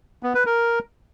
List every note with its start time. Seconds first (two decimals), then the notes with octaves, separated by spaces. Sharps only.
0.23 B3
0.35 B4
0.46 A#4